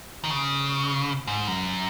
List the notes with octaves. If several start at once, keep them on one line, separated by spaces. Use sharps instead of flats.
D#3
C#3
G#2
F#2